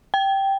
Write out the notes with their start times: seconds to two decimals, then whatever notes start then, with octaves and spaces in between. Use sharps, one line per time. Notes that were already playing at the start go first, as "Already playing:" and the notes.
0.14 G5